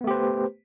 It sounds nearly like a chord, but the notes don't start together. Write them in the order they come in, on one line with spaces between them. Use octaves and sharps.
B3 A3 G4 C5 B4